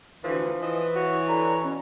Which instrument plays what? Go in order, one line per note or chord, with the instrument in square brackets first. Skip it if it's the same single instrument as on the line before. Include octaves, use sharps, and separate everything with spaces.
[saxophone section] D2 E3 [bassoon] F3
[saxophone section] E3 [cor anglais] D#5
[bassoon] F#4 [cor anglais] C#5
[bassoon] D3 [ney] A#5
[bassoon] B2 [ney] C#4